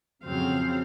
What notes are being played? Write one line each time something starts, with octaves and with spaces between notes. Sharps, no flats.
F2 C#3 F#3 C4 F5